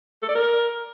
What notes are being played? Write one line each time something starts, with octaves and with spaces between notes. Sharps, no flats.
A4
D5
A#4